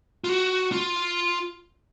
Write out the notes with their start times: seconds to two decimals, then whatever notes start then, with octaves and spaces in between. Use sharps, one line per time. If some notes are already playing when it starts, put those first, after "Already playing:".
0.24 F4
0.29 F#4
0.72 F4